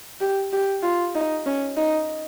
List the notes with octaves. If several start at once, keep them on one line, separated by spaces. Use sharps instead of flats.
G4
G4
F4
D#4
C#4
D#4